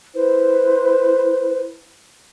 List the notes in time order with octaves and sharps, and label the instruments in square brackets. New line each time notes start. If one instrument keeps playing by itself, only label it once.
[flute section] E4 B4 C5